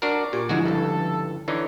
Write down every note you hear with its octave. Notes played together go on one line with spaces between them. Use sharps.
D4 F#4 A#4 D6
A#2 G4 C#6
G#2 D3 F3 G#3 E4 F#4
C#2 G2 A4
D3 E3 D#4 C#5